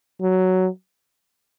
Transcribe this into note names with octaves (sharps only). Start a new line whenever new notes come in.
F#3